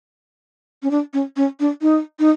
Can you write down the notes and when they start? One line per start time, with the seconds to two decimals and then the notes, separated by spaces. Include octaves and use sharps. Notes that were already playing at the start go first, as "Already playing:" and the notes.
0.83 C#4
0.91 D4
1.14 C#4
1.37 C#4
1.60 D4
1.82 D#4
2.19 D#4